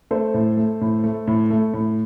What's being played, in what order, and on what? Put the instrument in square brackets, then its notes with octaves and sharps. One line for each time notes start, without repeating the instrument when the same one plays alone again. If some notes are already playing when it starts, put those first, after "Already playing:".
[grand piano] A3 A4 C5
A2
A3
A2
A3
A2
A3
A2